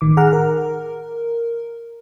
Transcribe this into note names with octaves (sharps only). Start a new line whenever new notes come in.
G#1 A2 D#3 D6
G#4 F#5 A#5 F6
A#4